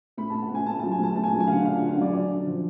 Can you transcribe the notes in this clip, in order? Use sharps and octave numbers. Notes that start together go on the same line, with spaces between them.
A3 B5
A3 A5
F#5
A3 G#5
A3 A5
F#3 A5
G#5
A3 A5
A3 A5
G#5
A5
F#3
G#5
D3 F5 F#5
D4 F5
D3 F#5
F5
F#3 D5
D4 D5
D4
F3